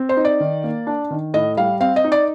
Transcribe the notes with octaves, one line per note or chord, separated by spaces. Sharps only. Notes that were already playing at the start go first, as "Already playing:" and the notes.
Already playing: C4
C5
D#4
D5
D#3
A#3
D4
D#3
A2 D#5
G3 F5
C4 F5
D#5
D#4
D5